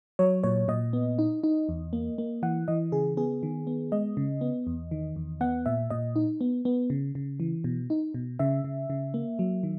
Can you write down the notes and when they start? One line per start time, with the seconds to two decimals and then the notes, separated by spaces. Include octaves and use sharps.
0.19 F#3 C#5
0.44 A#2 C#5
0.68 A#2 D#5
0.93 B3
1.19 D#4
1.44 D#4
1.69 E2
1.93 A#3
2.18 A#3
2.43 E3 F#5
2.68 E3 D#5
2.92 C#3 G#4
3.17 B3 G#4
3.43 D#3
3.67 B3
3.92 G#3 D#5
4.17 C#3
4.41 B3
4.67 E2
4.91 D#3
5.16 E2
5.41 B3 F#5
5.66 A#2 E5
5.90 A#2 D#5
6.16 D#4
6.41 B3
6.65 B3
6.90 C#3
7.15 C#3
7.40 E3
7.64 B2
7.90 D#4
8.14 B2
8.39 C#3 E5
8.64 C#3
8.90 C#3
9.14 A#3
9.39 F#3
9.63 D#3